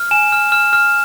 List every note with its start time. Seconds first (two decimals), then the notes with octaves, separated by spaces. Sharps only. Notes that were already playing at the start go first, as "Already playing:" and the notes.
Already playing: F6
0.11 G#5 E7
0.32 F6
0.52 F6 E7
0.73 F6